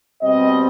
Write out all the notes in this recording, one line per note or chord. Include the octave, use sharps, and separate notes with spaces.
B2 G3 C4 D#5